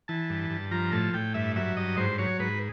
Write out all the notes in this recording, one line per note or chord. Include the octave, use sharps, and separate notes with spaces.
E3 A5
G2
G2
F3 A#5
A2 A5
A2 G5
G2 E5
F#3 E5
G2 D#5
G#2 C5
F#3 C#5
G#2 B4